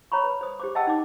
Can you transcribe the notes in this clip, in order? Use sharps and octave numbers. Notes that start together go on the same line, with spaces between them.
C#5 A#5 B5 C#6
B4
C5 D#6
G4 C5 D6
D#5 F#5 G5 A5 E6
D#4 D6